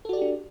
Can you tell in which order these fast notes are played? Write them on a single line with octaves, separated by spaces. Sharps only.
A4 F#4 D5 G4 D4